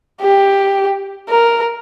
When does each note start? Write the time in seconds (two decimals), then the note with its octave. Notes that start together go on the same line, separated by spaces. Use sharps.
0.21 G4
1.29 A#4